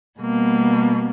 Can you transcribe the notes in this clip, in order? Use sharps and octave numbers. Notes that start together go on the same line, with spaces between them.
B2 G3 A#3